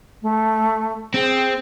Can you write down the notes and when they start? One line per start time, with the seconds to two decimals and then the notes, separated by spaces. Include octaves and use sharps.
0.22 A3
1.14 C4 G#4